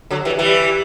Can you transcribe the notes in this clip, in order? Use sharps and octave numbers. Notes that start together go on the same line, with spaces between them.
D3 F#3
E3 G3
E3 G3